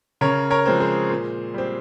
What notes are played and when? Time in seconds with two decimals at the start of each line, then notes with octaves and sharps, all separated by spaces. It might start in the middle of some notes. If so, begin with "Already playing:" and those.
0.21 C#3 A#4 C#5
0.50 A#4 C#5
0.66 F3 G#3 C4
0.80 G#4 C5
1.10 A#2
1.54 G3 C4